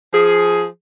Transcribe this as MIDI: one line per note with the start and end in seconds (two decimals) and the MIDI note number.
0.14 0.66 53
0.14 0.66 68